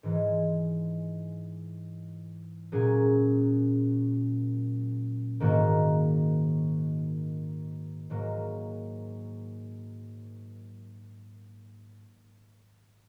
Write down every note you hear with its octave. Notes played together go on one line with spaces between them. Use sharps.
G#2 E3 G#3
A#2 F#3 C#4 G#4
G#2 D#3 A#3 D#4 F#4
G#2 F#3 A#3